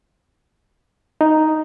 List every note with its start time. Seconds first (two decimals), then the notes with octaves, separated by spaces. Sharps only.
1.21 D#4